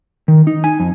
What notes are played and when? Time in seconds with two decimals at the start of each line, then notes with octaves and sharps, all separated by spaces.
0.28 D#3
0.47 D#4
0.64 G#5
0.80 F2